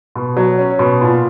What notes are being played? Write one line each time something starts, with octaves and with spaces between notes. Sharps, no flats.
B2
F#3
C#4
B2
A#2